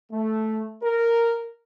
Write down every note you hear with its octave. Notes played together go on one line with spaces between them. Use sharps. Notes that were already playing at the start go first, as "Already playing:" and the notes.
A3
A#4